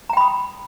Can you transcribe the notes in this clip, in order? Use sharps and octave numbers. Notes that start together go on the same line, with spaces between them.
G5 A#5 B5 D#6